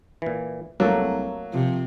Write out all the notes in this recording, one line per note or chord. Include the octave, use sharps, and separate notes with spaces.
A#2 E3
C2 F#3 A3 A#3 F#4 A4
C3 F3